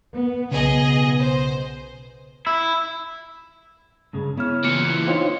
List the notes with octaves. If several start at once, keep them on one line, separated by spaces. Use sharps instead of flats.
B3
B1 C#3 B3 G#4 D#5
C5
E4
G2 C#3 G#3
C#3 B3 C#4 E4 F6
A#2 E3 C#7
D4 D#4 F4 C5 C#5 G5